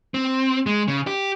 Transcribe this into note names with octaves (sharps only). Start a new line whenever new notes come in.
C4
G#3
C#3
G4